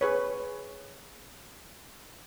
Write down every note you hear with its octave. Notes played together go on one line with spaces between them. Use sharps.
G#4 B4 C#5